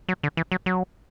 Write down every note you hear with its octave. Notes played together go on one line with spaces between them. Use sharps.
F#3
D3
E3
F#3
F#3